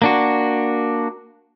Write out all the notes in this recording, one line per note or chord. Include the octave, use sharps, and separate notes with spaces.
A#3 D4 F#4